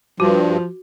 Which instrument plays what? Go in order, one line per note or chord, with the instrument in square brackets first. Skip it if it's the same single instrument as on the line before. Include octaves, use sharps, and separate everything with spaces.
[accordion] G2 [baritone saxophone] F3 [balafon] F#4